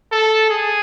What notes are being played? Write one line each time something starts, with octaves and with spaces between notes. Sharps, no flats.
A4
G#4